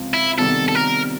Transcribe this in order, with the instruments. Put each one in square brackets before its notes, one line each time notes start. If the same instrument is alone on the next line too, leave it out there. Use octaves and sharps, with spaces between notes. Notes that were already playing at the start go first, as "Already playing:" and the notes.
Already playing: [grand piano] C#2 C3 F3 C4
[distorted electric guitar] E4
[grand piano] C3 D#3 G3 B3 [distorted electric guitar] A4
[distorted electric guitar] A4
A#4